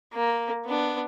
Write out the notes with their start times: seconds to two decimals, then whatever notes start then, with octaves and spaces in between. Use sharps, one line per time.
0.13 A#3
0.65 B3 D4